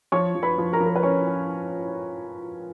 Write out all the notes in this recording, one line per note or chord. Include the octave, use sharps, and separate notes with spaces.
F3 C#5 C#6
F3
B4 B5
F3
A#4 A#5
F3
A#4
B4
C#4 C#5
C#4